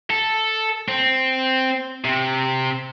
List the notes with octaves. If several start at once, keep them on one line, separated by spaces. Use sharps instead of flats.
A4
C4
C3